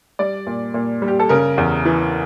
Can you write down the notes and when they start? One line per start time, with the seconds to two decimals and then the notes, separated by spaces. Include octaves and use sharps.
0.19 G3 D5
0.47 A#2
0.74 A#2
1.02 G3
1.08 G4
1.20 A4
1.29 C#3 A#4
1.58 E2
1.85 E3